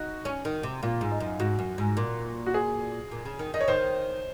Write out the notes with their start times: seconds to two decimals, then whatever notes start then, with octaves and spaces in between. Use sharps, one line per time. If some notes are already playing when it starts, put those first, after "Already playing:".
Already playing: D#4 F#4
0.25 C#4
0.45 D#3
0.63 C3
0.83 A#2 F4
1.01 G#2
1.11 D#4
1.20 F#2
1.40 G#2 F#4
1.59 F#2
1.78 G#2
1.97 A#2
2.46 F#4
2.54 G#4
3.11 A#2
3.25 C#3
3.39 D#3
3.54 D#3 D#5
3.61 C#5
3.68 D#3 C5